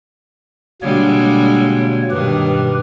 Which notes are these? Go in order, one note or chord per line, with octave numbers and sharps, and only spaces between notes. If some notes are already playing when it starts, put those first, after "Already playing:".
B2 D3 G3 G#3 A#3 C#5
G2 B2 D#3 G4 B4